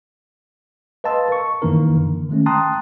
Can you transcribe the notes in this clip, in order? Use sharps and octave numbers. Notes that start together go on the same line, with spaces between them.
B4 D#5 F5 A5 C6 E6
A#4 C#6
F#2 D#3 E3 A#3 D#4 A#4
D3
D#3 G#3 A3 C#4
G5 A5 A#5 C6 D#6 F#6